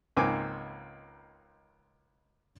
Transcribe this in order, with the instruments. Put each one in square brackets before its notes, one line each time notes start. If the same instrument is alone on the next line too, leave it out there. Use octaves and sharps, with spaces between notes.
[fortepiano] C#2 G#2 A#3 C4 G#5 D6